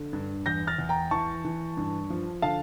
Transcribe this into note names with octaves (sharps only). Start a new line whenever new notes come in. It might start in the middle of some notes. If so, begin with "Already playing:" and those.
Already playing: D3
G2
E2 G6 A#6
F6 A6
E2
G5 A#5
E3 A5 C#6
E3
G2
F3
D3 F5 A5